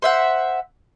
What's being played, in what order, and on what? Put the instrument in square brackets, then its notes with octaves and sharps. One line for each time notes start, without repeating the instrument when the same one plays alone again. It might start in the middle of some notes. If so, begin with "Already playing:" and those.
[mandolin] C5 E5 F#5